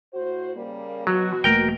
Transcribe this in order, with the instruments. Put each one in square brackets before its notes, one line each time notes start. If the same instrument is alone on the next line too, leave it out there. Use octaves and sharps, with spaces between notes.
[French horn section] A2 F#4 C5
C#3 G3 A#3
[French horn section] B2 F#4 [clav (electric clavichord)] F#3
[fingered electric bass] E1 A3 A#3 [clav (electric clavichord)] A#4 G5